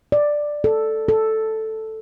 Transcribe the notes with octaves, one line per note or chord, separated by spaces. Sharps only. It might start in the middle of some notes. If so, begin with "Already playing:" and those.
D5
A4
A4